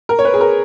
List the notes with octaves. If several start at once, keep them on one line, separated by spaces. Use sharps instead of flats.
A#4
C#5
B4
G#4
A#4